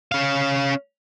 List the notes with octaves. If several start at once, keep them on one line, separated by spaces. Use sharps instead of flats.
C#4 F5